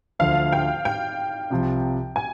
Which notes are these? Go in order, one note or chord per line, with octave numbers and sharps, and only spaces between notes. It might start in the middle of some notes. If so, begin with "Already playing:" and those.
D2 D3 F3 F5
G5
G5
C2 C3 F3
G#5